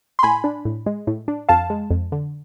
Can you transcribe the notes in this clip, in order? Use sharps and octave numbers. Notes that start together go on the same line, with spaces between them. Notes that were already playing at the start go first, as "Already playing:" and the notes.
C6
A2 G#5 B5
D4
A2
G#3
A2
D4
F2 F5 A5
G#3
F2
D3